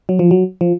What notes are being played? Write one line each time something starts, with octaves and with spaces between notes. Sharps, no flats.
F#3
F3
F#3
F3